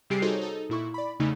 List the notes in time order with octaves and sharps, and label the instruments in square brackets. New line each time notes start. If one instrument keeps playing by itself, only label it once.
[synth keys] C3 G3 G4 G#4 C7 D7
D#4 F#4 G#4 A4 C5 C#5
D#4 A4
A#2 E4 C#6
D5 B5
E2 C#3 A3 D#4